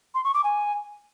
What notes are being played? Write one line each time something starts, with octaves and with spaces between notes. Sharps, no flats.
C6
C#6
D6
G#5